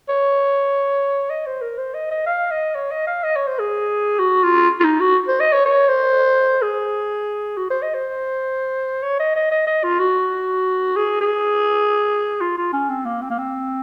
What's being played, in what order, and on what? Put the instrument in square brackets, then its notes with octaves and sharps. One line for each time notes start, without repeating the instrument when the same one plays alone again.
[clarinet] C#5
D#5
C5
A#4
C5
D#5
D#5
F5
D#5
C#5
D#5
F5
D#5
C#5
C5
G#4
F#4
F4
F4
D#4
F#4
C5
D#5
C#5
C#5
C5
G#4
F#4
C5
D#5
C5
C#5
D#5
D#5
D#5
D#5
F4
F#4
G#4
G#4
F4
F4
C#4
C4
A#3
C4
A#3
C4